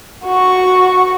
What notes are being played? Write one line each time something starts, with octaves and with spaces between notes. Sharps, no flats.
F#4 C#6